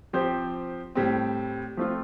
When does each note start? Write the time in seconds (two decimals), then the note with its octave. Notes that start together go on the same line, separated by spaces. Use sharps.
0.13 F3 C4 G4 C5
0.95 A2 G3 C4
1.77 F3 A3 C4 F4